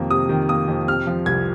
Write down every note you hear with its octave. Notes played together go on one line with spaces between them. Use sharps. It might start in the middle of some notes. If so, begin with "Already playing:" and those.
Already playing: F2 C3 D#3 A#3
C3 D#6
D#3
A#3 D#6
F2
C3 F6
F3
C2 G#6